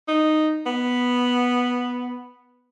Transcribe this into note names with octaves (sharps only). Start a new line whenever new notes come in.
D#4
B3